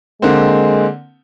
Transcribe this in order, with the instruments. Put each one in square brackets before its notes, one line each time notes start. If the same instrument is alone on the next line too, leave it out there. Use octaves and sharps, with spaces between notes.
[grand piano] D3 A#3 C4 [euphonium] G#3